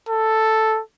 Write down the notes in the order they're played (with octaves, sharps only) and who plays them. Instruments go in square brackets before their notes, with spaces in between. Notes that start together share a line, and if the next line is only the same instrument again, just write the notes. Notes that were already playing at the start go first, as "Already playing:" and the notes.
[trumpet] A4